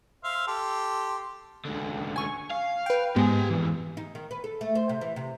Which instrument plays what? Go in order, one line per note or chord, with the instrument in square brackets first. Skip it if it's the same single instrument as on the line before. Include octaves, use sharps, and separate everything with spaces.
[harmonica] C5 E5 F5
G4 A4 C6
[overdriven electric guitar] C#2 D3
[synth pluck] G#5 C#6
[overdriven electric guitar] F5
[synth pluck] B4 G5
[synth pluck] G#2 G#3 B3 [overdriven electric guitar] G4 G#5
[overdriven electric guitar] F2 E3
[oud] D#4
D#3
B4
A4
A3
C5
C3
E3
C3